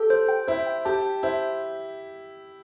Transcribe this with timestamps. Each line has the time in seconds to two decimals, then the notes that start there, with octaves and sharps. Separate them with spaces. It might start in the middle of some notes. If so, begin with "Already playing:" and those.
Already playing: G4 A4
0.10 C5
0.29 G5
0.48 E4 C5
0.66 G5
0.85 G4 A5
1.04 A5
1.23 E4 C5